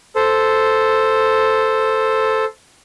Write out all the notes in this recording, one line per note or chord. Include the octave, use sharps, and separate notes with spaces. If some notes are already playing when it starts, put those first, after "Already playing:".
A4 C5